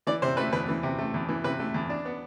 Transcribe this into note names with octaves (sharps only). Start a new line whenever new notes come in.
E3 D5
C3 C5
A3 B4
E2 B4
E3
C3
A3
E2
E3
C3 B4
A3
E2
D4
B3